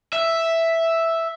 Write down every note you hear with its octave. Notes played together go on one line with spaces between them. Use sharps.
E5